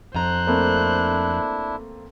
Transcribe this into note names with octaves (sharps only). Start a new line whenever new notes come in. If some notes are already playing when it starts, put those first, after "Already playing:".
F2 C5 A#5 F#6
A3 A#3 C4 D4 E4